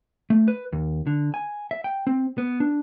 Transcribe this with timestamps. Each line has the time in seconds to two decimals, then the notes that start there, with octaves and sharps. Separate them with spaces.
0.30 A3
0.48 B4
0.72 D#2
1.07 D3
1.34 G#5
1.71 E5
1.84 G5
2.07 C4
2.38 B3
2.60 D4